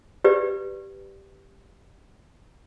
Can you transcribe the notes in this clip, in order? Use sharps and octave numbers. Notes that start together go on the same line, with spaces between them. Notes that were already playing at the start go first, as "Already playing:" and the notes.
G4 B4 D5